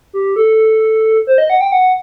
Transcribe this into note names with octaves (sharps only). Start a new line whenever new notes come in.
G4
A4
C5
D#5
F#5
G5
F#5